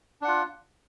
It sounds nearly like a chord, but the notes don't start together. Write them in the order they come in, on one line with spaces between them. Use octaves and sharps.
D4 F#5 F4